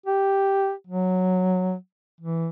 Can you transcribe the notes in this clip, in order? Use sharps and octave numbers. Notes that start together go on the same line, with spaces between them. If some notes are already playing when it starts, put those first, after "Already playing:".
G4
F#3
E3